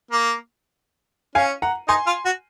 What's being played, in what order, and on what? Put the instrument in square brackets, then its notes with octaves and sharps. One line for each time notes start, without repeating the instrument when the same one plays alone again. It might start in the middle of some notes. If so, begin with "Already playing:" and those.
[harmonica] A#3
[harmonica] C#4 [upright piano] F5 G#5
[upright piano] F#5 A#5
[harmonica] D#4 [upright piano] G#5 C6
[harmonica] F4
F#4